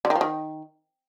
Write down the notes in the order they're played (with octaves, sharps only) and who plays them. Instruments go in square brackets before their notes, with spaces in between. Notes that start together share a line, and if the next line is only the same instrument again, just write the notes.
[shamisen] D3
D#3
F3
D#3